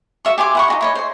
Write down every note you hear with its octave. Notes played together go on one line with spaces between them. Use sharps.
F#4 E5 C#6
G4 G#5 C6 D6
E4 F#5 C#6
D#4 F#4 D#5
E4 C#5 D#5
C5 C6